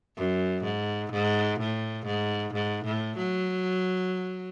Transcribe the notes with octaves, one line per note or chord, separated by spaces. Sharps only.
F#2
G#2
G#2
A2
G#2
G#2
A2
F#3